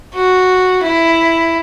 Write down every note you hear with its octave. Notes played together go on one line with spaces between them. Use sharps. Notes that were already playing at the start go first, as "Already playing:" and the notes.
F#4
E4